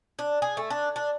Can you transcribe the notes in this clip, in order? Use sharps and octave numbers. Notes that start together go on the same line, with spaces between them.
D4
G#4
A3
D4
D4